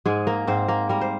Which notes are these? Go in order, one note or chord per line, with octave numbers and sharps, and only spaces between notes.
G#2 G#3 G#4
A#3 A#4
G#2 C4 C5
A#3 A#4
G3 A#4
C5